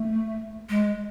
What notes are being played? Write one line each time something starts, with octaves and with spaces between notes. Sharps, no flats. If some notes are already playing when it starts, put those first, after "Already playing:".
Already playing: A3
G#3